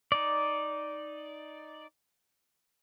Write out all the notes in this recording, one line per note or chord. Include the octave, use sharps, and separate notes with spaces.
D#4 D5